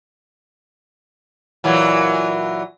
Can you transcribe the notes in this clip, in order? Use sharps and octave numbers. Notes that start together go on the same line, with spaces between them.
A#2 E3 F#3